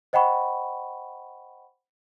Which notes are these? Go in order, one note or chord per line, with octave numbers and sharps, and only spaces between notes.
C5 D#5 F#5 G5 B5 C#6